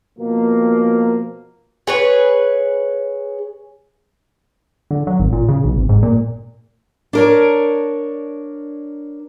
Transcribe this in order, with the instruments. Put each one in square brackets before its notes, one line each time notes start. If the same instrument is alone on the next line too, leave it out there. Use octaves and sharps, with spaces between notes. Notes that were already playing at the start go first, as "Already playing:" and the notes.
[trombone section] B2 F3 A#3
[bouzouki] G#4 B4 C#5
[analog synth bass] D3
F#3
G#1
A#2
C#3
B1
G#1
G#2
A#2
[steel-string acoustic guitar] D4 A#4 C#5